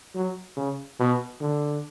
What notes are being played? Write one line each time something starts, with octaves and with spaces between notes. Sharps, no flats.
F#3
C#3
B2
D3